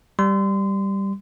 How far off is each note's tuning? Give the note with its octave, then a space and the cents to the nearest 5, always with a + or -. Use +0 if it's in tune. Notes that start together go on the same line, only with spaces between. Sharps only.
G3 +0 C6 -30